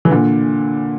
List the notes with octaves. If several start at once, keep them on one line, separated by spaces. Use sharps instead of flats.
E3
A#2 D3